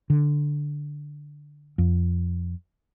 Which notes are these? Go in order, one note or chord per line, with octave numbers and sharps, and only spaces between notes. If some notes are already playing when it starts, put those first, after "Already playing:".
D3
F2